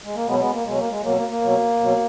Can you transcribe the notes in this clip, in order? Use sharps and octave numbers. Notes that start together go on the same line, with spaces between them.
G#3
A#3
B2 F#3 G#3 B3
G#3 B3
A#3
B2 F#3 G#3
A#3
G#3
B2 F#3 A#3
A#3
A#3
B2 F#3
B2 F#3